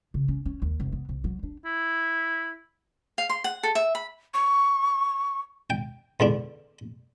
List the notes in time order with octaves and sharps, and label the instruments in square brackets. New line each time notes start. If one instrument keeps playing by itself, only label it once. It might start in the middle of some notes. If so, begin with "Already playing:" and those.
[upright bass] C#3
C#4
C#4
D#2
F1
B3
C2
F#3
D4
[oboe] E4
[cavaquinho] F5
C6
F#5
A4
E5
B5
[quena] C#6
[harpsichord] G5
E2 D3 D4